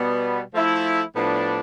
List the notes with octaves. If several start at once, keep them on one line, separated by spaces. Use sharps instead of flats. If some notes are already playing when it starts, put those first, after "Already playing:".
Already playing: B2 G3 B3
F3 A3 E4 A4
A2 F3 B3 D4